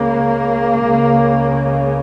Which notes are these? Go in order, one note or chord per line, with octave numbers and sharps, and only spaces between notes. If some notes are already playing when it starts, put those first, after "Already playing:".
Already playing: C#2 C#3 A#3
C#2 C#3